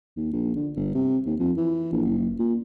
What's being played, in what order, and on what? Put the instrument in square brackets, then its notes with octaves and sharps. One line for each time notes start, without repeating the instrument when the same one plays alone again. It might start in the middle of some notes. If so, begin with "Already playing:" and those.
[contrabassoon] D#2
A#1
D3
G1
C3
D#2
F2
E3
A#1
F#1
A#2